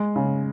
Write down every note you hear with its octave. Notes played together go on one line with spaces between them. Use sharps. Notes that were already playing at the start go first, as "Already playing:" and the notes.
Already playing: G#3
C#3